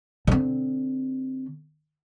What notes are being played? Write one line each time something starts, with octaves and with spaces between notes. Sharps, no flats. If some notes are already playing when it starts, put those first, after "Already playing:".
D3 C4